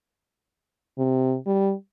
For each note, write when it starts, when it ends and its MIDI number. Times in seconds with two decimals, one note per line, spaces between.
0.98 1.36 48
1.47 1.73 55